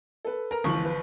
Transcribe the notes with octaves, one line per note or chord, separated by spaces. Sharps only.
A4 B4
A#4 A#5
G1 C#2 E3 F3 C#6 F#7
B4